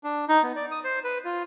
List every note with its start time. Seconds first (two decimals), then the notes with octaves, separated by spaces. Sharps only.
0.04 D4
0.29 D#4
0.43 B3
0.56 D5
0.71 D#6
0.84 C5
1.04 B4
1.25 F4